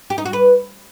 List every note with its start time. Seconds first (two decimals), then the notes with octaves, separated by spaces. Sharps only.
0.10 G4
0.18 D#4
0.26 F#4
0.33 B4